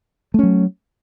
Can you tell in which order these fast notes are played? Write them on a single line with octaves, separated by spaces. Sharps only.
A3 C#4 F#3